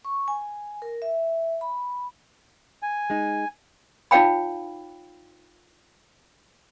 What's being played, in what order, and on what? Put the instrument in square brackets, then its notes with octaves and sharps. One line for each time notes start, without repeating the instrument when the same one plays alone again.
[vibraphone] C#6
G#5
A#4
E5
B5
[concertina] G#5
[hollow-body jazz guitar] G#3 D#4
[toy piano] D#4 F4 C#5 F5 G5 B5